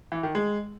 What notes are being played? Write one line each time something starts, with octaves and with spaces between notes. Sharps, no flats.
E3
D#3
G#3